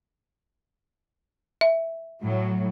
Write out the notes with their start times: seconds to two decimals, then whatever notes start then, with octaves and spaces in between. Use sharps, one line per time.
1.61 E5
2.21 A2 F#3